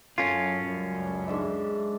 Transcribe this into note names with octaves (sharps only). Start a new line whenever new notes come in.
F#2 C#4 F4 A4
C#2 F#2 G3
G#2 D4 E5